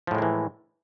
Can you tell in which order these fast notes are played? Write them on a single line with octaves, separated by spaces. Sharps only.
F3 A2 G#3 A#3 E3